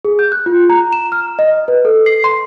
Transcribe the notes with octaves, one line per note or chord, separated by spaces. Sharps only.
G#4
G6
F#6
F4
A#5
E7
F6
D#5
B4
A4
C7
C6